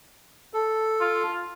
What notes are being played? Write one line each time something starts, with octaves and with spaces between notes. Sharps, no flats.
A4
F4